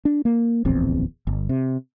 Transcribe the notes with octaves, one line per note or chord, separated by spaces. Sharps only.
D4
A#3
D1 A#1 E2 C4
G1
C3